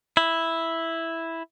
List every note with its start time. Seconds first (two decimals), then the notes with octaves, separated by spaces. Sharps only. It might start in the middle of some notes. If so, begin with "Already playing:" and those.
0.17 E4